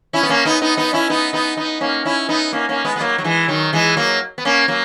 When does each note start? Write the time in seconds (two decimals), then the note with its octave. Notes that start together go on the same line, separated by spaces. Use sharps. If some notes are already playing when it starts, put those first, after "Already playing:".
0.13 C#4 E4
0.23 B3
0.29 A#3 C#4
0.45 B3 D#4
0.62 B3 D#4
0.77 B3 D#4
0.93 C#4 E4
1.10 B3 D#4
1.33 B3 D#4
1.57 B3 D#4
1.81 A#3 C#4
2.05 C#4 E4
2.29 B3 D#4
2.53 A#3 C#4
2.69 A#3 C#4
2.85 G#3 B3
2.96 B3
3.00 F#3 A#3
3.18 F#3
3.24 E3 G#3
3.48 D#3 F#3
3.73 E3 G#3
3.97 F#3 A#3
4.38 B3
4.45 A#3 C#4
4.68 F#3 A#3